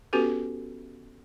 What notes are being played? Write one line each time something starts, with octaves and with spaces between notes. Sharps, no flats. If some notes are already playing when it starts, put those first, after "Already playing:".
B3 C#4 F#4 G4 A4 B4